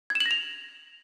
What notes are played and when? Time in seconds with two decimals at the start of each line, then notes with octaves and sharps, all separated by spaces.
0.10 G#6
0.15 E7
0.20 F#7
0.26 A#6
0.31 F7